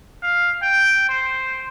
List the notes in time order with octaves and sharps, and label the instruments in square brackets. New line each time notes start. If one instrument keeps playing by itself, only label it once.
[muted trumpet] F5
G5
C5